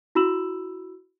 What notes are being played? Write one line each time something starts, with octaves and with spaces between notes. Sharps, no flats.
E4 F#4 B5 E6 E7 F#7